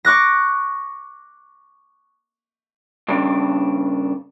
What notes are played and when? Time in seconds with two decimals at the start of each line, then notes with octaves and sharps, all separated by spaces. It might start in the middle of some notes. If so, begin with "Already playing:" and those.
0.05 C#6 D6 F#6 A#6
3.08 G2 C#3 D4